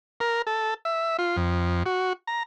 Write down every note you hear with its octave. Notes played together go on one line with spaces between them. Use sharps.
A#4
A4
E5
F4
F2
F#4
A#5